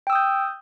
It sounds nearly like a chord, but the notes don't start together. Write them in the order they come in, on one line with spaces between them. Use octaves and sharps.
G5 E6 D#6 G6